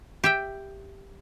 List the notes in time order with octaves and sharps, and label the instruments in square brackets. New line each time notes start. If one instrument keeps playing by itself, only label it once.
[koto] G4 E5 G5